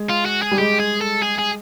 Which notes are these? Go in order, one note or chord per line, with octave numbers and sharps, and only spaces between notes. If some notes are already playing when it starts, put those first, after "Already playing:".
Already playing: G#3
F4
F#4
G#4
G3
G#3 G4
G#4
A4
G#4
G#4